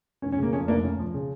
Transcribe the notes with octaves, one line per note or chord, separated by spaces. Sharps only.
F1 C#4
C#4
C#3 A#3
F2 C#4
F1 A#3 D4
D2 C#4
F3
C#3